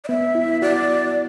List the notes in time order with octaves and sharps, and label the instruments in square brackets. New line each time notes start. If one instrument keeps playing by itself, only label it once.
[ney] D5
[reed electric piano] B3 [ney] E5
[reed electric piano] E4
[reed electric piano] F#4 [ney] D5